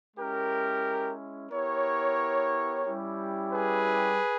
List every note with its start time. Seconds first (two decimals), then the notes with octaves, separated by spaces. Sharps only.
0.17 G#3 C#4 E4 G4 A#4
1.51 B3 E4 G4 A#4 C#5
2.86 G3 C#4 E4 G4
3.53 G#4 B4